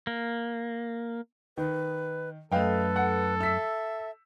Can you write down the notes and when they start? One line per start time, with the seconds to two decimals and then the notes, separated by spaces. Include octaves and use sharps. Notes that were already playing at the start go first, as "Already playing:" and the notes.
0.07 A#3
1.57 D#3 B4
2.52 F#2 A3 A4 B4 D#5 F5 G5
2.96 F#5
3.41 E5 E6 B6